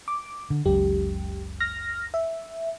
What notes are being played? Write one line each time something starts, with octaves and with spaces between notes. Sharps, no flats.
D6
D3
F#1 C#2 F#2 G4
F6 A#6
E5